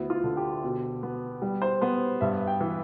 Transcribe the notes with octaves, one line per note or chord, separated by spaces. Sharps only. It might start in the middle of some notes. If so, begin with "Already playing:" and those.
Already playing: D2 B3 E4
F4
D3
G4
B2
B3
G3
C5
B3 C5
G2 E5
G5
E3